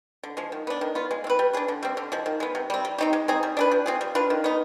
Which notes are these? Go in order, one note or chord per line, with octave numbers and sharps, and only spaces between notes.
D3
F3 G#3
D#3
B3 D4
D#3
B3 F4
G#3
C4 F4
B4
G3
D4 G#4 B4
D3
G3 C4
D3
F3 G#3
D#3
G#3 B3
C3
G3 C4
G3
C4 D#4 G4
G#3
C4 D#4 G#4
G3
D4 G#4 B4
F3
C4 F4 G#4
G3
D4 F4 B4
D#3
B3 D#4